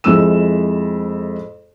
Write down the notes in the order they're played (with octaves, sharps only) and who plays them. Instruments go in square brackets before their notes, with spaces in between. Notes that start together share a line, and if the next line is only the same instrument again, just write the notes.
[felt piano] F2 G#3 E4 E6 E7